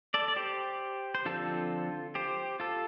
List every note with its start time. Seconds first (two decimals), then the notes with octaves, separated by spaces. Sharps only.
0.14 A4 D5
0.28 D5
0.36 G4 C5
1.15 C5
1.25 D3 F3 C4 F4 A4
2.15 G4 C5
2.60 F4 A4